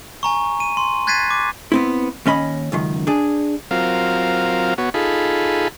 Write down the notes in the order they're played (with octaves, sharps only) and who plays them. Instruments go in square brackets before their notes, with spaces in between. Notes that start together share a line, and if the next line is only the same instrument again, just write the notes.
[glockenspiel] G#5 A#5 C#6
D#7
C6
F#6 G#6 A6 B6 C7 D#7
D6
[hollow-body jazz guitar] B3 C4 E4
D#2 C#4 D#5 B5
C#2 F#2 D#3
D4 G#4
[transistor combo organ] F#3 C4 F4 A#4 F5
B3 F#4 C#5
D#4 F4 G#4 A4 B5